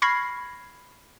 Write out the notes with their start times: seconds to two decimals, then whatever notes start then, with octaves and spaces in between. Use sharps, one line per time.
0.02 B5 C#6 F6 G#6 A#6 C7